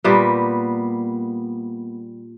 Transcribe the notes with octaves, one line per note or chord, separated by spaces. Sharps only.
A#2 G3 A#3 B3